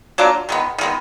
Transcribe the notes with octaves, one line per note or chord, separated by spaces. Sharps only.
F#3 A#3 D4 F4
D#3 G#3 B3
D#3 G#3 B3